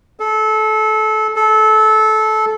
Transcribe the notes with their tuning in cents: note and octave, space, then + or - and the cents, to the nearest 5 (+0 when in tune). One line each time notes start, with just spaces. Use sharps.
A4 -25
A4 -20